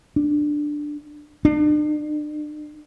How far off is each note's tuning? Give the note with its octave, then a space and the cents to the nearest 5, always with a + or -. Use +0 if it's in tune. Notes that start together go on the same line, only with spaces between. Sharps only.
D4 +10
D4 +40